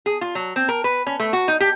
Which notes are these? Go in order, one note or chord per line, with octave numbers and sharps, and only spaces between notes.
G#4
F4
F#3
C4
A#4
B4
C#4
A3
F#4
D#4
G4